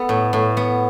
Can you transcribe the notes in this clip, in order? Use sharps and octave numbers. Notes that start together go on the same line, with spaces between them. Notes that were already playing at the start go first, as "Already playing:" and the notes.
Already playing: B3 A4
A2
A2
B3